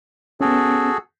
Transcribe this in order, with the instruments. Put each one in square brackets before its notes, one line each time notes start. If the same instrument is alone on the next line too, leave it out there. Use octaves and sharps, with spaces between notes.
[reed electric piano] B3 C#4 [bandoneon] F#4 G#4 A4